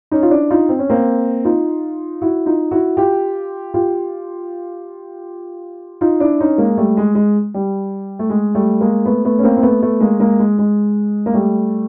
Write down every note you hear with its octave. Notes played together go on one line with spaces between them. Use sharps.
C#4 D#4
F4
D4 E4
D#4 F4
C4
C#4
A#3 C4
D#4 F4
E4 F#4
D#4 F4
E4 F#4
F4 G4
F4 G4
D#4 F4
D4 E4
C#4 D#4
G#3 A#3
G3 A3
G#3
G#3
G3
A3
G#3
G3 A3
G#3 A#3
A3 B3
A3 B3
C#4
A#3 C4
C4
A3 B3
A3 B3
G#3 A#3
G#3 A#3
G#3
G#3
A#3
G3 A3